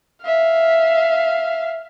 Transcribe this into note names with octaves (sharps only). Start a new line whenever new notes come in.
E5 F5